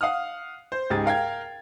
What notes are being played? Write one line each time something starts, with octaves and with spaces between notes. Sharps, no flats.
F5 F#5 D#6 F6
C5
C#2 G#2 G4 G#4 A6
A#4 F5 G5 G#6